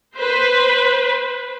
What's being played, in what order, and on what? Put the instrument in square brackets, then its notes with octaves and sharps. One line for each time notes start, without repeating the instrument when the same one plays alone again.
[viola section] B4 C5